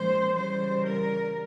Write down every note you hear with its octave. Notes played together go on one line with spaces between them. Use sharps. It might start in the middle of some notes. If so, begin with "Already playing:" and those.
Already playing: A#2 F3 G#3 C#4 C5
C#3 E3 G3 C5
A#4